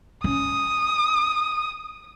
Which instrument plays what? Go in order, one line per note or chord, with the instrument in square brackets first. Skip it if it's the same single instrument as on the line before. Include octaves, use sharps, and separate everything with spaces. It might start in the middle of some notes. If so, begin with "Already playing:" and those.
[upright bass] C#4 [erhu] D#6